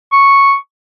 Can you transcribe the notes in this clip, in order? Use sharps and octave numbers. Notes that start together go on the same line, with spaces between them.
C#6